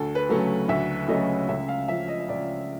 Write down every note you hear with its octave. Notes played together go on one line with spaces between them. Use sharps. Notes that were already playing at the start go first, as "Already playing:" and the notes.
Already playing: D2 A4
B4
C#3 F#3 A3 C#4
D2 E5
C#3 F#3 A3 C#4 D#5
C#2 E5
F5
C#3 F3 E5
D#5
D#5
C#2 D5